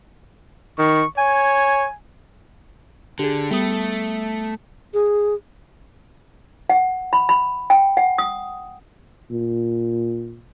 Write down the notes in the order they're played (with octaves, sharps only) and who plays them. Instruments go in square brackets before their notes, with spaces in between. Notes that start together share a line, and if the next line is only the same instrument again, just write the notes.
[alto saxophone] D#3 [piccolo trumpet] C#6
[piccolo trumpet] C#5 [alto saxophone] G#5
[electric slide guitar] D3 [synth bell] G4 G#4
[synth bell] G3 B3 D#6 [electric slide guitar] A3
[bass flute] G#4
[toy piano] F#5
B5
B5
G5
F#5
D#6
[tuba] A#2